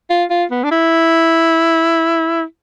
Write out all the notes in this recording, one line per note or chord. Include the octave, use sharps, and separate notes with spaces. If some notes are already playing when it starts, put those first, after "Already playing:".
F4
F4
B3
D4
E4